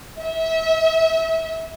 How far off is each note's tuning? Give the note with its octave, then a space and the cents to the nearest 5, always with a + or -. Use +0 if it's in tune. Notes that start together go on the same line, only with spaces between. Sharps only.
E5 -30